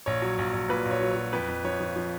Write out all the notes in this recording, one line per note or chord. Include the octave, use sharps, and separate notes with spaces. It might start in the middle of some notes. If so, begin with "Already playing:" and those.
A#1 C#5
F#3
A#1
A#1
A#2 B4
A#1
C#5
F#3
C#5
F#3
F2 B4
F2
F3 C#5
F3
F3